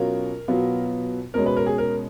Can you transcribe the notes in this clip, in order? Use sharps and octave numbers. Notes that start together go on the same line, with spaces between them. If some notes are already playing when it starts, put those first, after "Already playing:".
Already playing: B2 F#3 C#4 F4 A#4
B2 F#3 B3 F4
B2 G#3 C#4 A#4
B4
A#4
G#4
A#4